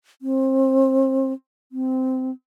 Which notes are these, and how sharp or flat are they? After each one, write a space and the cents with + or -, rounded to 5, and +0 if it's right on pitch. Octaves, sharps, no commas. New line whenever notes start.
C4 +30
C4 -15